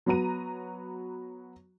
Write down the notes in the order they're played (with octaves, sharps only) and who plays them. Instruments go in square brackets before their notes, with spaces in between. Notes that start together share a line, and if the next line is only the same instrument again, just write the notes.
[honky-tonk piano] F#3 B3 F#4 A#5 D#7